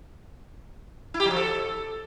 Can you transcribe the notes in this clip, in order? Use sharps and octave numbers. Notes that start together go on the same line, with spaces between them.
E4
G4
F#3
F3
A4